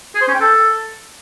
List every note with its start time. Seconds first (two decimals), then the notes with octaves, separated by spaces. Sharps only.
0.15 G#4
0.21 C5
0.28 C#4
0.34 G5
0.40 A4